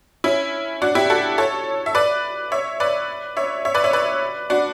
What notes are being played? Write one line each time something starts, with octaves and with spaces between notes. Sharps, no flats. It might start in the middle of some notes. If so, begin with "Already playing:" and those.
C#4 E4
D4 F#4
E4 G4
F#4 A4
A4 C#5
E5
B4 D5
C#5 E5
B4 D5
C#5 E5
C#5 E5
B4 D5
C#5 E5
B4 D5
D4 F#4